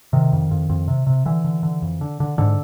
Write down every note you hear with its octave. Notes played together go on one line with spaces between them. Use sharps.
C3 D#3
F2
F2
F2
C3
C3
D3 E3
D3
D3
F2
D3
D3
G#2 D3